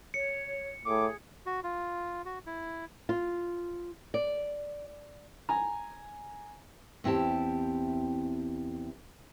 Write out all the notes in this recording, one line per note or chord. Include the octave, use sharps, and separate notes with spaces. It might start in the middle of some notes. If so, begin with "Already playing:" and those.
C#5 C#7
A2 G#4 D6
F#4
F4
F#4
E4
F4
D5
G#5 A#5
E2 C4 E4 G4 A5